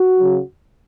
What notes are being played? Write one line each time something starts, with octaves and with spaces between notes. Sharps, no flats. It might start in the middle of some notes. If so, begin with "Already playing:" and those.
Already playing: F#4
C#3 F#3